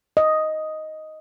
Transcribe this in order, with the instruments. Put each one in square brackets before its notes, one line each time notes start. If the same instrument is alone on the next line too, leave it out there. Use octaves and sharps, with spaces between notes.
[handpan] D#5